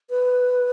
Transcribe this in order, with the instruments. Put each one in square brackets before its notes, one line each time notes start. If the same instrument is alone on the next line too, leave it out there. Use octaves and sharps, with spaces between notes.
[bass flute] B4